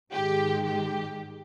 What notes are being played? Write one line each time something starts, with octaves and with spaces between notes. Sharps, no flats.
G#2 D#3 G#3 G4
G4